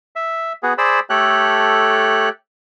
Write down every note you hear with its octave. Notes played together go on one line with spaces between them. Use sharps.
E5
B3 F#4 G#4
G#4 C5 D5 B5 E6
A3 G4 A4 C#5 F#6